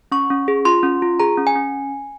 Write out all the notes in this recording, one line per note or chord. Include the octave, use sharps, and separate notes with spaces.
C#4 C#6
C#4
G#4
F4 C6
C#4
F4
G#4 A#5
C#4
G#5
C#4